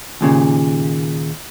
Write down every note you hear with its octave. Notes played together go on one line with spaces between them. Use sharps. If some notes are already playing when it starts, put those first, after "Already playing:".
D#2 A#2 C#3